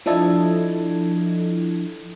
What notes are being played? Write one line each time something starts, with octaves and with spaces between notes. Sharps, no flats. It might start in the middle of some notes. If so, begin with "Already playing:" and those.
F3 D4 E4 A4 D#5 G#6